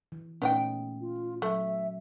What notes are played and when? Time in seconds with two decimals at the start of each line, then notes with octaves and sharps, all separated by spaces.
0.12 E3
0.42 A#2 A3 B3 C#4 D#4 G5
1.01 F4
1.42 F#3 A3 E5